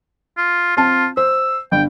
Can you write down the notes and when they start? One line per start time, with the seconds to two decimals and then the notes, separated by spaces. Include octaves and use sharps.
0.37 F4
0.77 C4 F4 A5
1.17 C5 E6
1.72 G1 G5